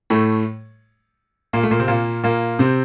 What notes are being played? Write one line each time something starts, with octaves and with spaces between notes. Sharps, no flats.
A2 A3
A#2 A#3
A3
A#2 A#3
C3 C4
A#2 A#3
A#2 A#3
C3 C4